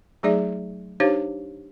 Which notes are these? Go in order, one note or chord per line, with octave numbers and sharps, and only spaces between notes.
F#3 A3 D#4 G#4 D5 E5
D4 D#4 G4 C5 C#5 F5